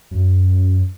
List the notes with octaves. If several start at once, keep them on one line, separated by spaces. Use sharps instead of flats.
F#2